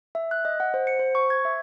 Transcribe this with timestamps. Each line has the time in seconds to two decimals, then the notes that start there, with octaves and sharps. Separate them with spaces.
0.15 E5
0.31 F#6
0.45 D#5
0.60 F#5
0.74 C5
0.87 C#7
0.99 C5
1.15 C#6
1.30 G#6
1.45 E5